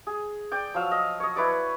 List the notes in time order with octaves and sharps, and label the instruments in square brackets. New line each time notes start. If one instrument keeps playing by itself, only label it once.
[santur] G#4
D5 G5
F3 F#3 F5 E6
D#5
C#5 D#5
E4 B4 C#5 D5